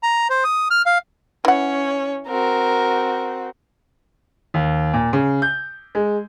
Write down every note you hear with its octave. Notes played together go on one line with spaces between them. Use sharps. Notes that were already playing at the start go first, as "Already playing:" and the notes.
A#5
C5
D#6
F6
F5
E3 C#4 C#5 F#5
C4 F#4 A#4
D#2
A#2
C#3
G6
G#3